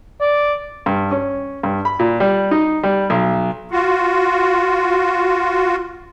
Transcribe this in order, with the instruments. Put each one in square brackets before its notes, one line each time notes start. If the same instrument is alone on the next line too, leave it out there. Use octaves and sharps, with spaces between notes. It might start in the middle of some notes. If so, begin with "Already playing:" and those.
[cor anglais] D5
[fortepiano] G2
C#4
G2
B5
A#2
G3
D#4
G3
B1
[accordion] F4 F#4